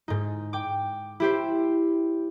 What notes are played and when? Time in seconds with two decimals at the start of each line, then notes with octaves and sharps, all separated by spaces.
0.08 G#2 D#4
0.53 G5 D6
1.20 E4 G4 C5